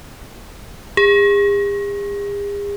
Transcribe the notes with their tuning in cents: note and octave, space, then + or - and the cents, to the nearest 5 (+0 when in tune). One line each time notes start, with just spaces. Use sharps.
G#4 -45